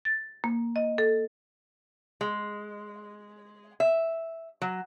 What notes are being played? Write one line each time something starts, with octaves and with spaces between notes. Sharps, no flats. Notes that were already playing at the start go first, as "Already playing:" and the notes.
A6
A#3
D#5
A4
G#3
E5
F#3